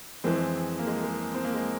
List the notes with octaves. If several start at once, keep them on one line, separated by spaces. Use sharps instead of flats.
F2 E3 G#3 C4
A#3
G#3
G#3
C4
A#3
G#3